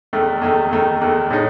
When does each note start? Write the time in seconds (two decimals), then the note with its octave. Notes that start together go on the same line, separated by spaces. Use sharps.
0.13 E2 D#3 A3
0.41 E2 D#3 A3
0.71 E2 D#3 A3
1.01 E2 D#3 A3
1.30 A2 G#3 D#4